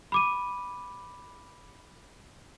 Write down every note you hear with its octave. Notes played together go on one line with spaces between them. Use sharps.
B5 D6 D#7